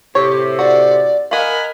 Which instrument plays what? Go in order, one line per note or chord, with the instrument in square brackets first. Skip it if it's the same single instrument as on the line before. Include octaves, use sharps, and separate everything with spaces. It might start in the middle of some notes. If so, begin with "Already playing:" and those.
[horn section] A2 C3 [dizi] G4 [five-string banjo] C#5
[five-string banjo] F#4 [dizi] D5
[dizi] A#4 [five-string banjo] D#5 F5 [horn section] F#5 G#5 B5